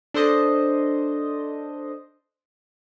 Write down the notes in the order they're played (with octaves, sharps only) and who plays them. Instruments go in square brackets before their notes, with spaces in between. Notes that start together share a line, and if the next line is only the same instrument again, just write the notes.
[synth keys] D4 A4 C5 D#5